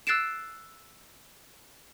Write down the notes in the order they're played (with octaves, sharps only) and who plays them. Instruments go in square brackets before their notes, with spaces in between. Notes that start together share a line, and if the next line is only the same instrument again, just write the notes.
[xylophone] E6 F#6 A6 C7 D7 E7